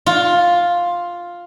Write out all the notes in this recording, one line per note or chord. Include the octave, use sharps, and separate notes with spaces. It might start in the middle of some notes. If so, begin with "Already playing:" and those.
F4